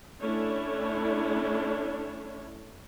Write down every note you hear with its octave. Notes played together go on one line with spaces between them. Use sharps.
A3 C#4 D4 E4 C#5